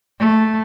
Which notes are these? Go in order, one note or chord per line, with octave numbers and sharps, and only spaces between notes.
A3